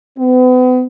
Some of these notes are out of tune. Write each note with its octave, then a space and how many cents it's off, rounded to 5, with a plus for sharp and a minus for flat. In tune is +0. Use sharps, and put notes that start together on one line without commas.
B3 +40